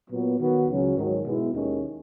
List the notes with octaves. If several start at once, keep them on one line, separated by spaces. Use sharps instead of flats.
A#2 F#3 B3
D#3 F#3 B3 F#4
C#2 C#3 F#3 C#4
G#2 D#3 F#3
B2 G#3 B3 E4
D#2 D#3 G#3 C#4